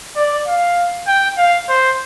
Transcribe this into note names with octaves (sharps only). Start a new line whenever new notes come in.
D5
F5
G5
F5
C5